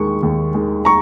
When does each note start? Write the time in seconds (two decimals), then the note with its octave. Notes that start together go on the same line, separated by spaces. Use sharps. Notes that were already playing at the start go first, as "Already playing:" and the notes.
Already playing: D#2 D#3 G#3 C#6
0.23 D#2
0.54 D#3 G#3
0.85 A#5 C#6